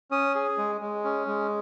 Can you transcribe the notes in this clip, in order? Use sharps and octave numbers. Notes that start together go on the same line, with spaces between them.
C#4 D#6
G#4
G#3
G#3
C#4
G#3